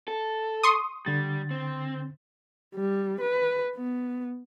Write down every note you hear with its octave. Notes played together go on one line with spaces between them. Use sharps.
A4
C6 C#6 D#6
D3 G3 A6
C4
G3
B4
B3